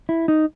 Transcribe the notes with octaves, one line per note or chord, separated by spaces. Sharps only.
E4
D#4